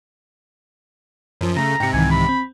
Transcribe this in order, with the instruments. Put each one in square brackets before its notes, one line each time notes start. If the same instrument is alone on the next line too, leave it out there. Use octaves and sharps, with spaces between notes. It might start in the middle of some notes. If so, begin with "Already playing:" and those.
[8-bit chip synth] F#2 F3
[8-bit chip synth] C#3 A3 [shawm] A#5
[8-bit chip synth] G#2 C3 [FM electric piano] G5 C#7
[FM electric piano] C2 D#3 E3 [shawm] G#5
[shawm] B5
[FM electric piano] C4